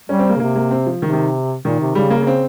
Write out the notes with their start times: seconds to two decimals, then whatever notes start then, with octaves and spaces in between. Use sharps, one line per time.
0.09 G3 C#4
0.19 C4
0.29 A#3
0.36 C#3
0.40 C3 A#3
0.56 A#3
0.71 C4
0.87 F3
1.02 C3 D#3
1.13 D#3
1.65 A#2 D#3
1.80 C3
1.95 C#3 G3
2.10 A#3
2.23 A#3
2.27 C4